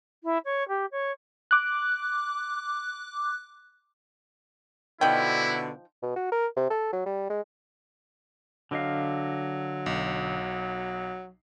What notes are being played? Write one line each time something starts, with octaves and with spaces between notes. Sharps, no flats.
E4
C#5
G4
C#5
D6 F#6
B2 D3 F3 D#4 E4 G5
B2
F#4
A#4
C3
A4
F#3
G3
G#3
D3 F#3 D#5 F5
B1